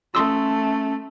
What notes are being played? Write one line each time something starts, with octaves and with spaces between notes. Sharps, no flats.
A3 C#4 C6 D#6 E6